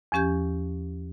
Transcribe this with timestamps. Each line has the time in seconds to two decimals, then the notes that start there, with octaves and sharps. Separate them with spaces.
0.12 E2 F3 C#4 G4 G6 G#6